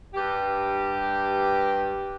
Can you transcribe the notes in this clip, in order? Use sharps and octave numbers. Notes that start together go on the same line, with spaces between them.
G2 G4